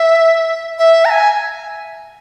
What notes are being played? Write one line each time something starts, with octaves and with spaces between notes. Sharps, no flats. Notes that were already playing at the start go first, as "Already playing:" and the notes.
Already playing: E5
E5
A#5
G#5